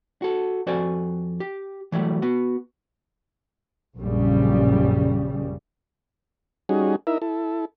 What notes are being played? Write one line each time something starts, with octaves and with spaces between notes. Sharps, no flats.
F#4 A4
F2 F#4 A4 C5 D5 G#5
G4
E3 F#3 G3 A3
B3 F#4
A#1 F#2 C#3 G3
G3 C#4 D#4 F#4 G#4
D#4 E4 A#4 E5
E4 A4